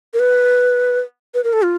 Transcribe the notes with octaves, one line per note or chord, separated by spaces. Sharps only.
A#4
B4
B4
A#4
A4
F4